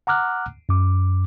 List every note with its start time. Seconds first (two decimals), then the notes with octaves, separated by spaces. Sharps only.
0.07 F#5 A#5 D6 F6 F#6
0.69 F#2 D6